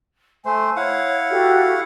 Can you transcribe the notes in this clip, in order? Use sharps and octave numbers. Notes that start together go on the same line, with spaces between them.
A3 C5 G#5
E4 C#5 F5 F#5
F#4 G4 A4